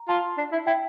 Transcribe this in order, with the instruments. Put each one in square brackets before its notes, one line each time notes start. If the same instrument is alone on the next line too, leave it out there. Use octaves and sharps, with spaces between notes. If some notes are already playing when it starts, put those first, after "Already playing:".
Already playing: [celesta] A#5
[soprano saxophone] F4 [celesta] A5
[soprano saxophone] D4
E4
[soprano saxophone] E4 [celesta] G5